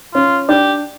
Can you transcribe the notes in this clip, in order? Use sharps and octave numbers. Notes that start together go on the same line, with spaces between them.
C#4 F4
D4 G4